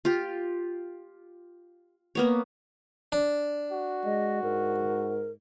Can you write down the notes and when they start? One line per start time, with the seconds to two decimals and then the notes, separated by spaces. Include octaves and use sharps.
0.05 F4 G4
2.15 A#3 B3 C#5
3.12 D4
3.72 F#4
4.05 G#3 D#5
4.43 G#2 A#4